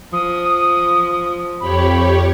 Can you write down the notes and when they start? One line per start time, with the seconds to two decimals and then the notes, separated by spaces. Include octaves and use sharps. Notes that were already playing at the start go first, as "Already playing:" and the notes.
0.13 F3 D#6
1.61 F2 G4 C#5 B5